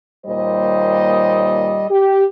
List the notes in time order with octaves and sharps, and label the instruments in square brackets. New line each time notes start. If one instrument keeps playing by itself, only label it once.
[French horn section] D#2 A#2 G3 C5 D#5
G4